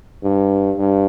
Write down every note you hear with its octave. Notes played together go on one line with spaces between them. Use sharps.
G2
G2